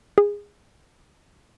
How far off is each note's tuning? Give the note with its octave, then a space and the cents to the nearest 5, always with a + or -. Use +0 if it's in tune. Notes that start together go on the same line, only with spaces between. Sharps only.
G#4 -20